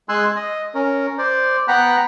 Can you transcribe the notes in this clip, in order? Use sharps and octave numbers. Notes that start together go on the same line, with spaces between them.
G#3 G#5 C6 E6 F#6
D#5
C#4 A#4
C5 D5
B3 F#5 G5 A#5 B5 F#6